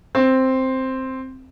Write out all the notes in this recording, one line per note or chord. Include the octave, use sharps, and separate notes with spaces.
C4